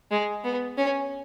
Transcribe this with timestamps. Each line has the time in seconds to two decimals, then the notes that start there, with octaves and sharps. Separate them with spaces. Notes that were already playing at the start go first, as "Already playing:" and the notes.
0.11 G#3
0.44 B3
0.77 C#4